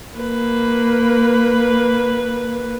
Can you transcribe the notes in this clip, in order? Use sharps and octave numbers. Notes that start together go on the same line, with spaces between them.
A#3 B4